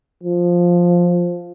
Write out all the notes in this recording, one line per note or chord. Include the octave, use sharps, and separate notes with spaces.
F3